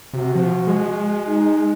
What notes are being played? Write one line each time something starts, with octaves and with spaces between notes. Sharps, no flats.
C3 F#4
F3
G#3
D#4